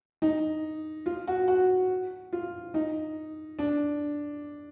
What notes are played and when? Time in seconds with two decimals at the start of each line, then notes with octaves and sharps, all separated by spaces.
0.22 D#4
1.06 F4
1.27 F#4
1.48 F#4
2.33 F4
2.74 D#4
3.59 D4